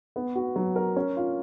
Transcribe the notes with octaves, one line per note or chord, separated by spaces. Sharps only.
B3
F#4
F#3
A#4
C#4
F4